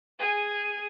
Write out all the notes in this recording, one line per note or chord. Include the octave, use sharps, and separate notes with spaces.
G#4 G#5